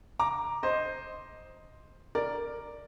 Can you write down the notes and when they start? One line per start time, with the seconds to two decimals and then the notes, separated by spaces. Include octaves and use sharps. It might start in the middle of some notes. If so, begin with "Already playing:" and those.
0.19 A#5 D6
0.63 C5 D#5
2.15 A#4 D5